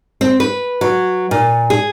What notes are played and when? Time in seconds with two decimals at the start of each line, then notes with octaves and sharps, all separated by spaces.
0.21 C4
0.40 B4
0.81 F#3
1.31 A#2
1.70 G#4